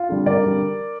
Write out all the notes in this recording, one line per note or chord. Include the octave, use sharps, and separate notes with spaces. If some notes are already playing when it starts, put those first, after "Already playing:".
Already playing: F4
D3 G3
G2 A#4 D5
D3 G3